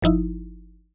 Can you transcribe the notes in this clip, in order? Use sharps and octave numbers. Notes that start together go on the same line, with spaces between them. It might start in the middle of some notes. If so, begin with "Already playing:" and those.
G1 F3 D#4 E4